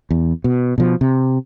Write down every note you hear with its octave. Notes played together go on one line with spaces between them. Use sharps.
E2
B2
B2 F3
C3